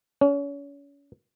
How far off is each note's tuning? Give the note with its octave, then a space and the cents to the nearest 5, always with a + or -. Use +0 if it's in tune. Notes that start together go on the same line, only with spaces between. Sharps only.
C#4 +35